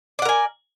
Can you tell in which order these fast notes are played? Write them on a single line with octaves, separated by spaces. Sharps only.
D5 F#5 A#4 G#5